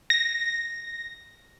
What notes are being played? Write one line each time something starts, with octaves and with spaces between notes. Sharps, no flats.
A#6